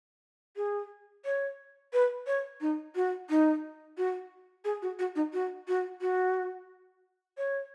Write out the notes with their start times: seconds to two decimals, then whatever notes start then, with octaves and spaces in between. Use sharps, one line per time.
0.56 G#4
1.25 C#5
1.93 B4
2.27 C#5
2.61 D#4
2.95 F#4
3.30 D#4
3.97 F#4
4.65 G#4
4.82 F#4
4.99 F#4
5.16 D#4
5.33 F#4
5.68 F#4
6.01 F#4
7.38 C#5